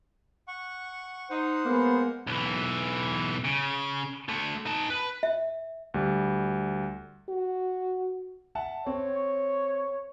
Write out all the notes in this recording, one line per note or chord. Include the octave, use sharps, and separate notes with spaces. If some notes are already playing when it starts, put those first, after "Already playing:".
F#5 C#6
D#4 C5 F#5
G#3 A#3 B3
B1 E3
C#3
D3 A3
D#4 A5
B4
E5
D2 G3
F#4
E5 F#5 A5
C4 C#5